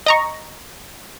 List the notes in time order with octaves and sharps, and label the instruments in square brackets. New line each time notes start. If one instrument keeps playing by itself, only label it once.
[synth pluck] D#5 A#5 C#6